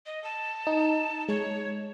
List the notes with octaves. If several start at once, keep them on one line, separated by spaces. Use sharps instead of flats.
D#5
A5
D#4
G#3 C#5